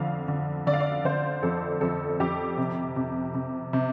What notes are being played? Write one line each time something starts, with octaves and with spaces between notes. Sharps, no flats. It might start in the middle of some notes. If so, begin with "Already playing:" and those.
Already playing: F2 D3 F5
D3
D3 D5
F5
D5
D3 C5
F2 A4
F2 A4
F2 G4
C3
C3
C3
C3